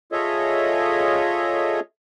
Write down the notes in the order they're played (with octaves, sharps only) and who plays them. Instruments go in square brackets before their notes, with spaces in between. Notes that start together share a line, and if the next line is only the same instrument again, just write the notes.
[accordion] F4 G#4 A4 C#5 D#5 E5